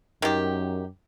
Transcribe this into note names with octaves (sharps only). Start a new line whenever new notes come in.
F#2 D#3 G4